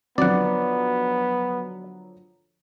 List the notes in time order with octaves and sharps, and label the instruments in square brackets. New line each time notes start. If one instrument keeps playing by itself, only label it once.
[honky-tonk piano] D3 F3 F#3 [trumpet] B3 [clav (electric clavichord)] D5 F#5